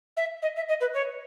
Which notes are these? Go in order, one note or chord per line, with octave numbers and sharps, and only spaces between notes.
E5
D#5
E5
D#5
B4
C#5